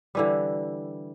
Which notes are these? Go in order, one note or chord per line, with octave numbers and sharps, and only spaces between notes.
D3 E3 G3